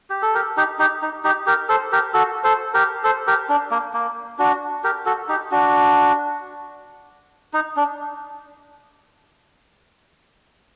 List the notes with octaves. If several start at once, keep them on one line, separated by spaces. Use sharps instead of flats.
G4
A4
G4 A#4
D#4 G4
D#4 G4
D#4
D#4 G4
G4 A#4
A4 C5
G4 A#4
F#4 A4
A4 C5
G4 A#4
A4 C5
G4 A#4
D4
A#3
A#3
D4 F#4
G4 A#4
F#4 A4
D#4 G4
D4 F#4
D#4
D4